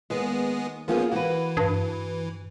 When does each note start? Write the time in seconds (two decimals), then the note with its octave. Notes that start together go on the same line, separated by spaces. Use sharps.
0.10 D#2 G#3 B3 G#4
0.88 F3 A#3 B3 C#4 F4 G#4
1.12 E3 F#4 B4
1.57 G2